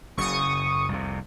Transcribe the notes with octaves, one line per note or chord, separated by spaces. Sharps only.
F#1 F#2 C#3 C#6 D#6
C2 F2 C3